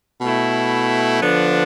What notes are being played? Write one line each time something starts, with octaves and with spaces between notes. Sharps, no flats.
B2 A3 E4
D3 F3 B3 D4